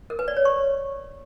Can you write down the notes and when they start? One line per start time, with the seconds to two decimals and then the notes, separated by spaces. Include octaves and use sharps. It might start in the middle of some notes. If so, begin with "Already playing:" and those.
0.10 A#4
0.19 B4
0.28 D5
0.37 C#5
0.45 C#6